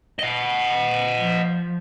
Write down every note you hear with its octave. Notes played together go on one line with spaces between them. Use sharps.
D#5 F#5
F3